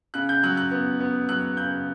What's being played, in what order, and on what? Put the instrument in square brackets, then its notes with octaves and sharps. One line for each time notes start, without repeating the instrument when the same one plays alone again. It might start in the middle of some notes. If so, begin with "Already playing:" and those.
[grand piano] C#3 F#6
G6
F#3 F#6
F#6
B3
B3
F#3 F#6
C#3 G6